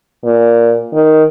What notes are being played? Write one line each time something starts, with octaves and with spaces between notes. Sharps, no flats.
A#2
D#3